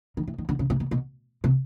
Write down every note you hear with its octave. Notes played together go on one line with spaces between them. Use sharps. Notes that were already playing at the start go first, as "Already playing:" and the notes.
D#3
E3
D#3
D3
C#3
C3
B2
B2
C3